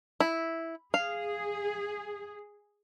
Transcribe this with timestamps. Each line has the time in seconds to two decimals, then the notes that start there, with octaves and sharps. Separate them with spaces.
0.20 E4
0.94 G#4 F5